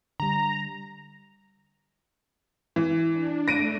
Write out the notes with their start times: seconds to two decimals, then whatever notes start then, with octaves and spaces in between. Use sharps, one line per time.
0.20 D3 G3 A#5
2.76 E3
3.13 D4
3.48 A3 A#6 D7 D#7